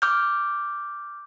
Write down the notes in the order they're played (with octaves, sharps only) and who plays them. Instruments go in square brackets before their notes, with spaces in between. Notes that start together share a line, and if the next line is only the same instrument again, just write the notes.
[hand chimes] D6 F6 G6